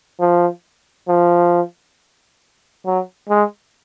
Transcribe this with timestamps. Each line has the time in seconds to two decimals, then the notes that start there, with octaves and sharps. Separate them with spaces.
0.20 F3
1.08 F3
2.86 F#3
3.30 G#3